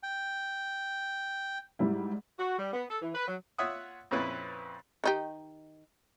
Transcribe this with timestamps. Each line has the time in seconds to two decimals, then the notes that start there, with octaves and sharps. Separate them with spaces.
0.03 G5
1.79 G#2 G3 E4
2.39 F#4
2.59 G3
2.73 B3
2.91 A4
3.02 E3
3.15 B4
3.27 F#3
3.58 F4 C#5 E5 F#5 D#6
4.11 F2 A#2 C4 C#4 E4 B4
5.04 D#3 D#4 G4